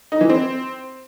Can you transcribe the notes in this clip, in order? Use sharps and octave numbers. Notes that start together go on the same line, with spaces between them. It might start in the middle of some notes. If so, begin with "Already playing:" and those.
D#4
E3
C4